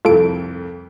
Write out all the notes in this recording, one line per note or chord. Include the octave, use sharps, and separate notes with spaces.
C2 F2 F4 A4 D7